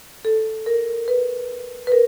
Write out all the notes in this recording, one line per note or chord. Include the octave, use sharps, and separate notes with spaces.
A4
A#4
B4
B4
A#4